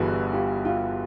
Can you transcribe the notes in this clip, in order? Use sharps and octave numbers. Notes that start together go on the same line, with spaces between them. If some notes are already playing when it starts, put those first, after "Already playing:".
Already playing: G1 G2 E3 F#4 G#4
F4 G4
F4 G4